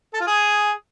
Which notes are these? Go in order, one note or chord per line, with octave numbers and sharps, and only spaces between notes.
A4
F4
G#4